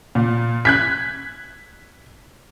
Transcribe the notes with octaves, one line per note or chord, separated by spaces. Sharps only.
A#2
F#6 G#6 B6